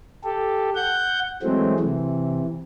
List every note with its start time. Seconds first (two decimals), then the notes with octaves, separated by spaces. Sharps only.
0.24 G4 A4
0.75 F#5 G6
1.43 E3 F#3 G#3 A3 C4
1.80 C3 E3